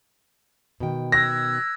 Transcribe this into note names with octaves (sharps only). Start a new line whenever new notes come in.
B2 D#3 G5
E6 F#6 G#6 A#6